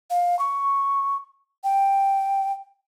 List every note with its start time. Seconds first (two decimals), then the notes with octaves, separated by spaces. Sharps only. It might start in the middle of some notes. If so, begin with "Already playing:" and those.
0.10 F5
0.39 C#6
1.64 G5